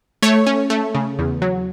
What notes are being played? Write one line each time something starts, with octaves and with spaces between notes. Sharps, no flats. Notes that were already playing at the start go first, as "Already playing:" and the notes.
A3 C#5
C#4
A3
C#3
E2
F#3